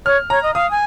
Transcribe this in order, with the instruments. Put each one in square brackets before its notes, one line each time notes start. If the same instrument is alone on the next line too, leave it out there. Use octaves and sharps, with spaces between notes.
[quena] C#5 [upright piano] F6
[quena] C#5 [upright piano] A#5
[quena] D#5
[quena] F5 [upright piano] D#6
[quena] G#5